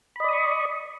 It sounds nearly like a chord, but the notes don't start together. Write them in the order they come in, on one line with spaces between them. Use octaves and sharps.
B5 D#5 D5 D#6 C#6